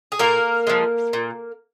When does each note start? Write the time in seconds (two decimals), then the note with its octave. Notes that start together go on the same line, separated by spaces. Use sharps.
0.12 G#4
0.19 A#2 A#3 A#4
0.67 F3 G#3
1.13 A#2